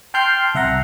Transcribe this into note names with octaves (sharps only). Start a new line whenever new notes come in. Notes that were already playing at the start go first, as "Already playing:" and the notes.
G5 A5 C6 F6 G6 C7
C2 E5 F#5 A#5